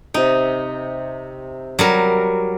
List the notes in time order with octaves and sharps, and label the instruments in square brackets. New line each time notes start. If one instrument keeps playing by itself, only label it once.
[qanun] C3 G5 [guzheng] D#4
[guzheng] F#3 G3 A#4